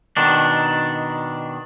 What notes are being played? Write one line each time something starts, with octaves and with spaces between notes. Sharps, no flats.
B2 D#3 D4